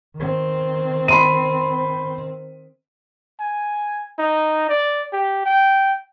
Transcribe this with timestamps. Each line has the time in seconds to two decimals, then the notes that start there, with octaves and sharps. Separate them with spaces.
0.16 D#3 C4
1.08 B5 C6 D#7
3.40 G#5
4.19 D#4
4.69 D5
5.13 G4
5.46 G5